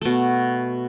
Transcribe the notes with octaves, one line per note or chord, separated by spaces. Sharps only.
B2 A3